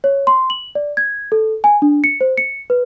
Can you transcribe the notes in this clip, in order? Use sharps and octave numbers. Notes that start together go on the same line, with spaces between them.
C#5
C6
F#7
D5
G#6
A4
G#5
D4
C#7
C5
C#7
B4